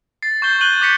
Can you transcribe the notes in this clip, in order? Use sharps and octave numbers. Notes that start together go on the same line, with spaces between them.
A6 C7
C#6 G6 G7
F#6 G6 D#7 F#7 G7
D6 G6 A#6 B6 C#7